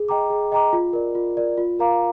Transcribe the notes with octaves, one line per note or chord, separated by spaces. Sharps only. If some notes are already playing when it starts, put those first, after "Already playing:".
Already playing: G#4
D#5 G5 A#5 D6
G#4
D#5 G5 A#5 D6
F4
A#4 D5
F4
A#4 D5
F4
A#4 F5 A#5 D6